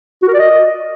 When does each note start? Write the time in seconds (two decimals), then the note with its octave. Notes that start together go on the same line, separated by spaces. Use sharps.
0.23 F#4
0.28 A#4
0.34 D5
0.39 D#5